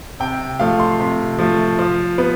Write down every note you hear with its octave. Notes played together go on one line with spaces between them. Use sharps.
C3 G5
F3 A3 F5
C6
C3
F3 A3
F3
B3